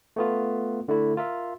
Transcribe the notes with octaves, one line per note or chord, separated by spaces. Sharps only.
A3 B3 F4
D3 A3 E4
F4 A#4 E5